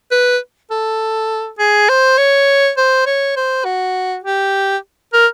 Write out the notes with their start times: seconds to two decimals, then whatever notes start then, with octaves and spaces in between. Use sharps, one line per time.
0.11 B4
0.71 A4
1.59 G#4
1.89 C5
2.17 C#5
2.77 C5
3.06 C#5
3.36 C5
3.65 F#4
4.24 G4
5.13 A#4